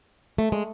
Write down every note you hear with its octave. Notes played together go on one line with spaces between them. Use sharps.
A3
G#3